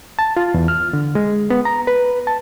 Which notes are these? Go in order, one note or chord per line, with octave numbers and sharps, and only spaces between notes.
A5
F4
E2
F6
D3
G#3
B3
A#5
B4
A5